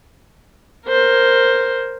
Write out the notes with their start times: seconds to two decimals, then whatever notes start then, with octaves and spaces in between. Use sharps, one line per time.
0.87 A#4 C5